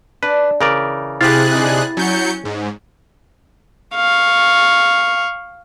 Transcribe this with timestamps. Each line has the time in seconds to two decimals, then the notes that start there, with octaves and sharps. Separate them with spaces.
0.23 D4 B4
0.61 C#3 E3 A#4 D5
1.21 C3 E4 G4 G#4 C5 F5 F#6 A6
1.55 D3 C4 D#4
1.97 F#3 C#4 G6 C#7
2.45 G#2
3.95 F5 C#6